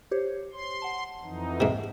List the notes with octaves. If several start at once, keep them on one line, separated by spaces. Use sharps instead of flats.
G4 C5 C#5
C6
F#5 A5
F2 E3 D#4
G#2 C3